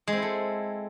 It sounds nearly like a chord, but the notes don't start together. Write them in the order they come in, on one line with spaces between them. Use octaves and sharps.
G#3 C4 E4 A4